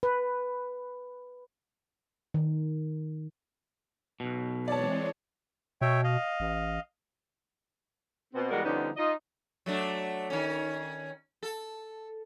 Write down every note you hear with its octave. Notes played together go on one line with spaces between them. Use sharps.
B4
D#3
B1 B2
E3 G#3 C4 C#5 D5 A5
B2 C#5 E5 G5
D#5 F5
A1
B2 C4
E2 G3 G#3 F#4 A#4 F#5
D3 F3 G3 B3 C#4 D#4
D#4 F4 D#5
F#3 A3 D4
D#3 C#4
A4